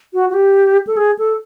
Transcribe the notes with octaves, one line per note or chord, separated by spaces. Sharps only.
F#4
F#4
G4
A4
G#4
A4